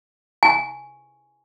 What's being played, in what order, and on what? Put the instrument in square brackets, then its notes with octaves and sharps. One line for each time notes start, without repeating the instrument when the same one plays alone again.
[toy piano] G#5